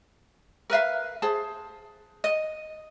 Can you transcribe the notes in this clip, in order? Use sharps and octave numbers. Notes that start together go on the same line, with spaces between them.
A#4 B4 E5 F5
G#4 C5 A5
D#5